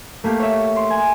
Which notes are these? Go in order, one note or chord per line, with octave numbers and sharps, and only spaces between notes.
A3 A#3 G4
C#5 E5
C6
G#5